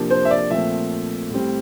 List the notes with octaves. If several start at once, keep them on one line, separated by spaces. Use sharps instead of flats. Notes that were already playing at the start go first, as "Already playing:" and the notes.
Already playing: C3 F3 A#3 D4
C5
E5
D5
A#2 F3 A3 C4 E5
A2 G3 C4